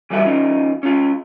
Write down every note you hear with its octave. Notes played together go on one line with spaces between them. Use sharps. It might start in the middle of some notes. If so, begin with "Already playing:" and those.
E3 G3 B3 F#4 E5
E3 C#4 D#4 F4
C#4 F4